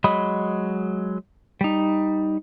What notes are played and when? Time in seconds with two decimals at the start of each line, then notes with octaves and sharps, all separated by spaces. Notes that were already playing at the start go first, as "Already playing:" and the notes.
0.04 F#3 G#3 D#5 B5 D#6
1.61 G3 D#4